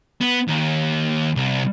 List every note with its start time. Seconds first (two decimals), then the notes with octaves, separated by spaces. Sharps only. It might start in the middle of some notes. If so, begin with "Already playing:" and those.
0.21 B3
0.48 D#2
1.36 C2